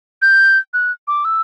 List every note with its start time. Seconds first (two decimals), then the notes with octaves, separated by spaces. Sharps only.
0.22 G6
0.74 F#6
1.08 D6
1.25 E6